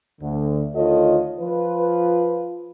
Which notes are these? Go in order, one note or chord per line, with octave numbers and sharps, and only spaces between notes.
D2 D3
D2 D#3 F4 A4 C#5 D#5
F3 F4 B4